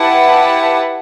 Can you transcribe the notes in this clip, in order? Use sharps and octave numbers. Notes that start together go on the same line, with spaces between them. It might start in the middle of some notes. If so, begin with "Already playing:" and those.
Already playing: E4 G4 B4 F#5 A5